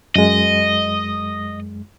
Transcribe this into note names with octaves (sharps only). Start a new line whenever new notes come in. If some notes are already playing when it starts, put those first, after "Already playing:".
F#2 G#3 D#5